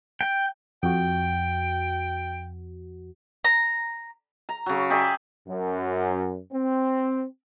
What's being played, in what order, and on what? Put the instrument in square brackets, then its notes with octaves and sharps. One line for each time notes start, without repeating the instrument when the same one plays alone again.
[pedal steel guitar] G5
[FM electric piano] F2 F#4 [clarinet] G5
[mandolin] A#5
[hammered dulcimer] A#5
C#3 F#3
G4 G#4 D5 E5
[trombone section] F#2
C4